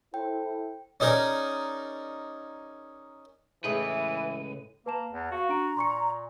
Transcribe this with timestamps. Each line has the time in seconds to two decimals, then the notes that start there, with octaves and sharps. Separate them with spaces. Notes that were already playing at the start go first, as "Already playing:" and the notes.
0.14 E4 A4 C5 G5
1.00 C#4 D#4 G#4 A#4 D5
3.64 C#2 A2 E3 G#3 B4 G5
4.86 A#3 B4 A5 E7
5.12 E2
5.31 F#4 F5
5.49 D4 A#5 D7
5.77 A#2 C6 C#6 C#7